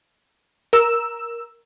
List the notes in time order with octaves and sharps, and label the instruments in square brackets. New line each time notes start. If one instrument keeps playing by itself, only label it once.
[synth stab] A#4 E6 E7